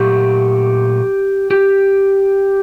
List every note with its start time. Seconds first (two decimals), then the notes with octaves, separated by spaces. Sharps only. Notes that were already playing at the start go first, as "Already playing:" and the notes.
Already playing: A#2 F#3 A3 G4
1.51 G4